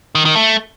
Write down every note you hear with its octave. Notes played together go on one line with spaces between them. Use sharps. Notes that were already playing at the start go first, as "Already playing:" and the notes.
D#3
D#3
A3